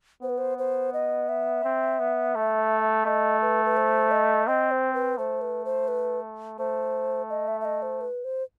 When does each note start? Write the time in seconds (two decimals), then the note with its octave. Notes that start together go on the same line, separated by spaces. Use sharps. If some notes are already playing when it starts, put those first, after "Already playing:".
0.22 B3 C5
0.29 B4
0.38 C5
0.58 C5
0.93 D#5
1.29 E5
1.64 C4
1.99 B3
2.35 A3
3.05 A3 D#5
3.42 B4
3.65 B4
3.77 C5
4.11 D#5
4.47 C4 D#5
4.71 C5
4.94 B4
5.17 A3 C5
5.41 B4
5.65 C5
5.88 B4
6.59 A3 C5
7.30 D#5
7.48 E5
7.61 E5
7.65 D#5
7.82 C5
8.01 B4
8.24 C5